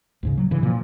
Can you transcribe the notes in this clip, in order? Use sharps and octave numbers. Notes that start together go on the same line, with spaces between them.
D2 G#2 C#3
F#3
G2 C#3 E3
A#2 F3